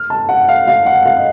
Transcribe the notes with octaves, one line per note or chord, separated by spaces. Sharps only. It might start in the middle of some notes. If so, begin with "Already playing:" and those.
Already playing: F6
A5
F#5
F5
F5
F#5
F5
D#5